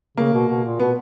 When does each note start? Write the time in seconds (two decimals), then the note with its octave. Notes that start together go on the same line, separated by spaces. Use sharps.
0.17 C#3 A#3
0.33 B2
0.48 B2
0.64 A#2
0.80 B2 B3